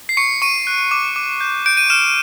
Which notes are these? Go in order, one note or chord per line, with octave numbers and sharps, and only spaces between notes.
C7
C#6 C#7
C#6 D#7
F#6
D6
D6
G6
G6 D7
D#7
F6 E7